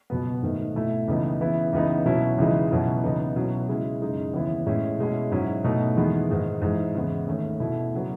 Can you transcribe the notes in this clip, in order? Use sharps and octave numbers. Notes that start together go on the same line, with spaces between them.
C#2 B2 F#3 B3
G#2 D#3 A3
B2 A3 E4
C#2 C#3 E3 B3 D#4
C#3 E3 B3 E4
C#2 C#3 E3 B3 D#4
B2 F#3 C#4 E4
C#2 C#3 E3 G#3 D#4
C#2 B2 F#3 C#4 E4
C#2 C#3 E3 B3 D#4
B2 F#3 C#4 E4
C#3 G#3 C#4 E4
F#2 C#3 G#3 D#4
D#2 C#3 E3 B3 E4
A2 G#3 C#4 E4
B2 G#3 C#4 E4
G#2 F#3 C#4 E4
B2 A3 D#4
E2 D#3 G#3 B3 E4
G#2 D#3 G#3
G#2 E3 G#3
E2 C#3 G#3 B3 E4
D#2 D#3 A3 C#4
B2 A3 E4
C#3 F#3 B3